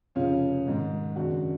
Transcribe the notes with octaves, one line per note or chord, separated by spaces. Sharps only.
F1 F2 C#3 F3 C#4 F4
G#1 G#2 G#3
G#1 F#2 C#3 D4 F#4